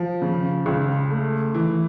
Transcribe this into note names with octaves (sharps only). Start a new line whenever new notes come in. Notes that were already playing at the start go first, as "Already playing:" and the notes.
Already playing: F3
C#3
C#2
A3
E3